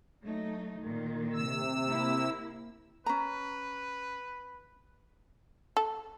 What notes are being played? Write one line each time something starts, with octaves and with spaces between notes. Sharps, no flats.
F#3 A3 D#4
A#2 D#3
C3 E6
A#3 E4
C#4 B4 A#5
A4